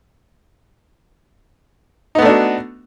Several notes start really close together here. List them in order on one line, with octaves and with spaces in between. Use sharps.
D#4 B3 A3 D4 F#4